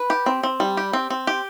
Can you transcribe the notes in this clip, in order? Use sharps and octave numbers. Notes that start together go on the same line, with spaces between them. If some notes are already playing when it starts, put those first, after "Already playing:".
Already playing: B4
G4
C4
C4
G3
G4
C4
C4
G4